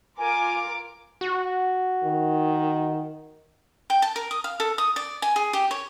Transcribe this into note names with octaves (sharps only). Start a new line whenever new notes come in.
F4 A#4 G#5 D6
F#4
D#3
G5
A5
A#4
D#6
F5
A4
D#6
D5
G#5
G#4
G4
C#5